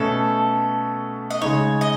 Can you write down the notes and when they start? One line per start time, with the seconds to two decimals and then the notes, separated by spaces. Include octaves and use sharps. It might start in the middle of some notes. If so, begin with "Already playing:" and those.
Already playing: B2 A3 C#4 A4
1.30 D#5
1.42 C#3 G#3 D#4 C#5
1.81 D#5